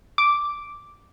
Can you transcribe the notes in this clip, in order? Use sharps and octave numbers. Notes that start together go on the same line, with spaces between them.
D6